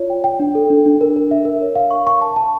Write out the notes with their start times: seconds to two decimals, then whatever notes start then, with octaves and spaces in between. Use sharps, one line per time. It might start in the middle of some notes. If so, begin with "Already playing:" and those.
Already playing: F4 C#5 D5
0.10 G5
0.24 G5
0.40 D4
0.55 A4
0.70 D4
0.86 D4
1.01 A#4
1.16 A#4
1.31 E5
1.45 A#4
1.61 C#5
1.75 F5
1.91 C#6
2.07 C#6
2.21 A5
2.36 A5